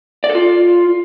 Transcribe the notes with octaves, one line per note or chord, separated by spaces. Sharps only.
D5
A4
F4